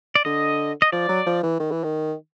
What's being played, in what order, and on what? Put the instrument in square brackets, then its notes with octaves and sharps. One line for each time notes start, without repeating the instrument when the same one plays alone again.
[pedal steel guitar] D5
[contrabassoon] D3 [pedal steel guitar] D#5
[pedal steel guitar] D#5
[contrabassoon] F3 [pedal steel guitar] D5
[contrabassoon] F#3
F3
E3
D#3
E3
D#3